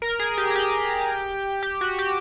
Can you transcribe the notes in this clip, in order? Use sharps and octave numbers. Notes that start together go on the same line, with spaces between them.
A#4
G#4
G4
G#4
G4
G4
F#4
G4